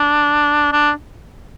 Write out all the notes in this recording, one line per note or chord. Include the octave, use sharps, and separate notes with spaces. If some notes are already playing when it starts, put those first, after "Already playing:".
Already playing: D4
D4